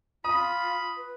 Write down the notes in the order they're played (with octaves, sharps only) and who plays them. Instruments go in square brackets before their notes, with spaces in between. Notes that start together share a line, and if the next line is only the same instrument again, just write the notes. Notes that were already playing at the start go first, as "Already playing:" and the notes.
[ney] F4 [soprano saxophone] B5 [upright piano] D#6
[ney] B4